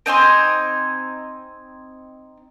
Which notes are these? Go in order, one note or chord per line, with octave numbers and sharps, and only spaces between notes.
C4 D#4 G#5 C6